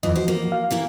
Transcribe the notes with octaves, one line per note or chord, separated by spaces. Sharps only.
F2 E3 F3 D#5
F3 F#4 C5
A#3
F5
E3 A#3 E4